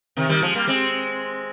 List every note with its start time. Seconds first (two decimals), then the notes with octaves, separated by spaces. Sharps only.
0.17 C3 D#3
0.29 D#3 G3
0.42 F3 G#3
0.54 G3 A#3
0.67 G#3 C4